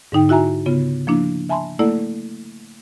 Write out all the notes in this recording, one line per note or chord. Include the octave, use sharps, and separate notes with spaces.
G#2 D3 D#4 G5
E4 F#4 E5 G#5 A#5
C#3 B3 F4
F3 A#3 D4 E4
E5 G#5 A5 B5 C6
A3 A#3 E4 A4 D5 F#5